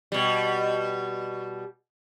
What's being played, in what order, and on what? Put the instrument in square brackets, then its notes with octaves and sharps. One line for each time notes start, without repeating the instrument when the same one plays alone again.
[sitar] B2 G3